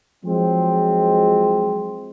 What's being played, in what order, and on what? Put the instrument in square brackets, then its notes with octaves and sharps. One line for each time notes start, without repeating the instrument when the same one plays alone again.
[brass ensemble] F3 F#3 G#3 C4